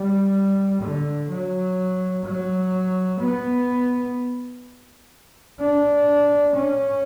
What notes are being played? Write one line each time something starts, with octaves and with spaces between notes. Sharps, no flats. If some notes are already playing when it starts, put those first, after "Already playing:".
Already playing: G3
D3
F#3
F#3
B3
D4
C#4